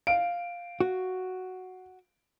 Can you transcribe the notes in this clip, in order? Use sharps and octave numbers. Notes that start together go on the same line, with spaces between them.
F5 D7
F#4